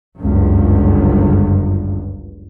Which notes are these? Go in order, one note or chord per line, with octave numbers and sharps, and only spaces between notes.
G1 C#2 F#2